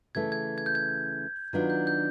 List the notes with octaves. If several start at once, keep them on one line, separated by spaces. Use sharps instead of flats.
C#3 E3 A3 G#6
G#6
G#6
G6
G#6
D#3 F#3 B3 D4 F4
G6
G6